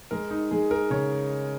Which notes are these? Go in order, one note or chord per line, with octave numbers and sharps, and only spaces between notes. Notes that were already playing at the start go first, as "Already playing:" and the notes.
G#3 A#4
D#4
G#3 G#4
A#4
C#3 C#5